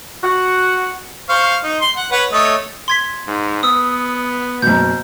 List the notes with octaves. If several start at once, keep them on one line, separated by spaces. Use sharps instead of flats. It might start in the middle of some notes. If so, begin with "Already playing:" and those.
F#4 F#5
C5 F5 C#6
D#4
C6
F#5
B4 C#5 F#5
A3 C#5 D#5
C6 G#6 B6
G#2
B3 D#6 E6
F#1 B2 G6